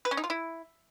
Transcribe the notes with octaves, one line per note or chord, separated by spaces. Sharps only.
B4
C#4
D#4
F4
E4